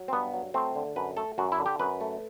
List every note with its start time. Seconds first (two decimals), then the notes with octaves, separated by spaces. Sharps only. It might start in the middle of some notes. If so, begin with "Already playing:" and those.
Already playing: F#3
0.08 C4
0.13 G2 B3
0.33 F#3
0.54 A3 C4
0.76 D3
0.96 F#2 B4
1.17 A3 A4
1.38 F#2 F#4
1.52 E4
1.59 D3
1.66 G4
1.80 F#2 B4
2.01 A3